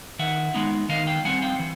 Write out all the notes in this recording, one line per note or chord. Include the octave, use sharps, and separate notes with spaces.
D#3 E5 F#5
G#3 B3 D#4
D#3 D#5 F5
F5 G5
G3 C4 F#5 G#5
F5 G5
E3